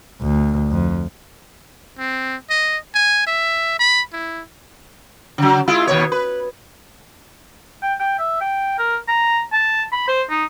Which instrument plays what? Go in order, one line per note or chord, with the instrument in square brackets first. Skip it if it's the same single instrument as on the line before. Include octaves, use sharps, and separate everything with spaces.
[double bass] D2
F2
[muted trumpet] C4
D#5
G#5
E5
B5
E4
[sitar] C#3 F#3
G#3 E4 F4
D#2 B2 C#5
B4
[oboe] G5
G5
E5
G5
A#4
A#5
A5
B5
C5
D#4